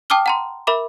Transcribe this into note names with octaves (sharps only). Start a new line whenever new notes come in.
G5 A5 D6 D#6 F6 G7
F#5 A#5 C6
A#4 E5 B5 D6